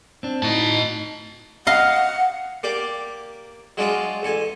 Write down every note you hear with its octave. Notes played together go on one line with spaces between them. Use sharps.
C4 D4
A2 D#4 D#5 A5
D#5 F5 F#5
A#3 G4 D5
F#3 G#3 D4 F4 G#4
A1 A4 G#5